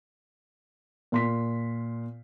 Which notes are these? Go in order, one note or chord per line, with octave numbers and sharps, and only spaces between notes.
A#2 C6 B6